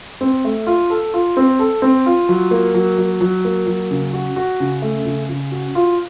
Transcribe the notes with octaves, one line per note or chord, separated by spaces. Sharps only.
C4
A3
F4
A4
F4
C4
A4
C4
F4
F#3
A#3
F#3
F#3
F#3
A#3
F#3
C#3
F#4
F#4
C#3
A3
C#3
C#3
F#4
F4